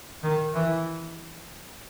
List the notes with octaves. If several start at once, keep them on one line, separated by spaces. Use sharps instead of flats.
D#3
E3